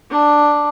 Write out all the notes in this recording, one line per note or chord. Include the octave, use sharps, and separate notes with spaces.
D4